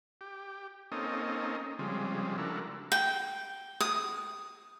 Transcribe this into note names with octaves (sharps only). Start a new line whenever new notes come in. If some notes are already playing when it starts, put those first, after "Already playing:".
G4
A#3 C4 C#4 D#4 A4 D#5
C#3 F3 G3 G#3 C4
D4 E4 F#4 A4 A#4
G5
D#6